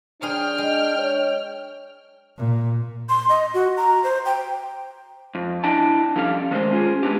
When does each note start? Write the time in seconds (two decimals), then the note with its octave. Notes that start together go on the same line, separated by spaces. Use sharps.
0.22 F#3 D4 G#4 C5 G5 F6
0.58 G#3
0.99 C#5
2.38 A#2
3.09 C6
3.29 D#5
3.54 F#4
3.77 A#5
4.04 C5
4.26 G5
5.35 F2
5.64 D4 E4 D#5 G5 A5
6.16 F3 G3 C#4 A4 F5
6.51 D#3 G#3 A3 A4 A#4 C5
6.71 C#4 F4 G#4
7.03 G#3 B3 D4 G4